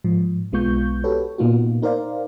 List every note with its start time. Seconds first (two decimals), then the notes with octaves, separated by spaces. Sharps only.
0.04 G#2 F3
0.52 B1 G#3 B3 F4 C#6 G6
1.04 F#4 G4 A4 B4 C#5
1.38 A#2 A#3 B3 D#4 F4 F#4
1.82 D#4 A#4 C5 D5 F5